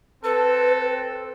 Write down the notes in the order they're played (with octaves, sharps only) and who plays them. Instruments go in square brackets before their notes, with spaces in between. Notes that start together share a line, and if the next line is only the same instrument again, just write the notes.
[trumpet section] C4 A4 [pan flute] B4